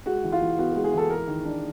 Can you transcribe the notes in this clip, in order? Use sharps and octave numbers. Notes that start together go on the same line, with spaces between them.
G#3 F#4
E3
F4
E3
B3 F#4
G#3 F#4
G#4
E3 A4
G#3 A#4
D#3
D4